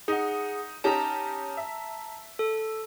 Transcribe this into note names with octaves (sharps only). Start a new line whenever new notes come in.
D#4 G#4 F#5
C#4 D#4 G4 A5 A#5
E5
A4